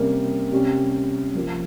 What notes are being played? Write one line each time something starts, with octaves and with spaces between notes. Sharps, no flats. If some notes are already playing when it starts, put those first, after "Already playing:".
Already playing: C3 G3 A#3 C#4
C3 G3 C#4
F3 A#3 F4